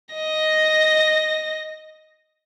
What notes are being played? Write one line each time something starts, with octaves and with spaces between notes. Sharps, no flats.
D#5 A#6